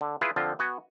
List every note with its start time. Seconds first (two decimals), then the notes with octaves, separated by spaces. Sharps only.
0.01 D3
0.21 E4 F4 G#4 B4
0.36 D3 F3 C4 F4
0.59 B3 F#4 G#5